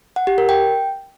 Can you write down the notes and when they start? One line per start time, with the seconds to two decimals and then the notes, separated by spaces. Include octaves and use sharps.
0.16 F#5
0.27 G4
0.38 A#4
0.49 G5